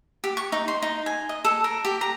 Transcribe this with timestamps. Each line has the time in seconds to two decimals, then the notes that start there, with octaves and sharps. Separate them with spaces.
0.24 G4
0.37 C#6
0.52 D#4
0.68 C6
0.82 D#4
1.06 G#5
1.29 D#5
1.44 A4
1.64 A#4
1.85 G4
2.01 A#5